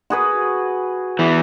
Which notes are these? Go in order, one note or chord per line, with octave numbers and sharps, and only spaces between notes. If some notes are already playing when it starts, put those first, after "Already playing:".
F#4 G#4 B4
E2 E3